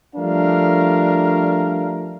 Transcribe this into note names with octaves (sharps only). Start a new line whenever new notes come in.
F3 G3 A3 D4 A#4 F5